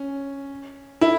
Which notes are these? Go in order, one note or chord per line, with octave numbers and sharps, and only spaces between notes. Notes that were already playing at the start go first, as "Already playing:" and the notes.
Already playing: C#4
E4